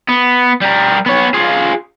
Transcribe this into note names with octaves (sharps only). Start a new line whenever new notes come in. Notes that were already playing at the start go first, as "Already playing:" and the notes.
B3
G3 A#4
B3 C#5
F4 G#4